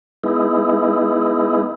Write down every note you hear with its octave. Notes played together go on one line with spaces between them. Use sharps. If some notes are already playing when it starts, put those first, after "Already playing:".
G#3 B3 D#4 E4